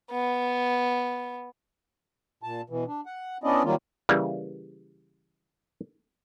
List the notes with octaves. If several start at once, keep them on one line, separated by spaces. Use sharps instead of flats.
B3
A#2 A5
B2 E3
D4
F#5
B3 C#4 D4 E4 D5 D#5
D#3 F#3 G3 A#3 F4
C#3 E3 G3 A#3